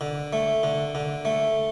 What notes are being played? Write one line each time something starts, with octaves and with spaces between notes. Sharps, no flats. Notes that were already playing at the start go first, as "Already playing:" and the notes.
D3
A3
D3
D3
A3